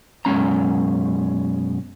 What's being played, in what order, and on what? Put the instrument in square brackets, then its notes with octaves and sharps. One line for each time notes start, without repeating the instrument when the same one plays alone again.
[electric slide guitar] F#2 B2 G#3 C#4 A#5